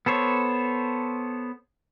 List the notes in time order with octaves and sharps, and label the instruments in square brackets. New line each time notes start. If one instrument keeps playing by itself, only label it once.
[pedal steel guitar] B3 A4 C5 C#5